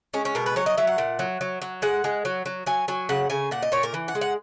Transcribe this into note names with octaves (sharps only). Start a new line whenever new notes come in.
G#3 C#4
C#4
B2 A#4
B4
F#3 C#5
D#5
F#3 E5
F#5
A#2
F#3
F#3
F#3
G#3 F#5
G#3
F#3
F#3
F#3 G#5
F#3 G#5
C#3 F#5
C#3 G#5
A#2 F#5
D#5
A#2 C#5
A#4
E3
F#5
G#3
F#5